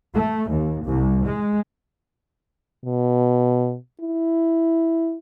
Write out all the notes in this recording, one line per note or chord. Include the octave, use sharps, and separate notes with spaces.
A3
D#2
C2
G#3
B2
E4